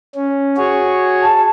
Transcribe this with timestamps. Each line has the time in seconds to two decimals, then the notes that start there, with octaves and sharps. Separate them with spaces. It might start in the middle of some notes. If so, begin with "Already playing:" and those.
0.15 C#4
0.57 F#4 G#4 C#5
1.23 A5